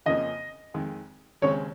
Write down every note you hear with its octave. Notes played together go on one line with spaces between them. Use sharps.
F2 C#3 F3 A#3 C#4 D#5
F2 D#3 G#3
D#2 C#3 G#3 C4 C#5